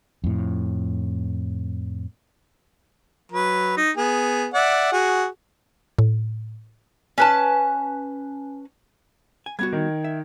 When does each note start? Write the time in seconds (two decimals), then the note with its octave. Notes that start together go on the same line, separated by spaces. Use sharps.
0.24 F2 A2
3.32 F#3 B4
3.77 D#4
3.97 B3 G#4
4.54 D5 E5 F#5
4.92 F#4 G#4
5.99 A2
7.18 C#4 B4 A5
9.46 G#5
9.59 G3 B3 F#4 G#6
9.72 D#3
10.04 E5